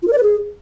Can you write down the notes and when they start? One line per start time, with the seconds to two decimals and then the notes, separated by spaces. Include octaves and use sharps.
0.02 F4
0.08 A#4
0.13 D5
0.18 B4
0.23 G#4